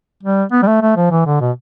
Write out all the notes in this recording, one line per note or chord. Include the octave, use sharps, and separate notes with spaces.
G3
B3
G3
A3
A3
F3
E3
D3
B2